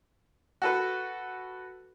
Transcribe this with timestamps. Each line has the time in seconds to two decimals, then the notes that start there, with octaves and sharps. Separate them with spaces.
0.62 F#4 A4 B4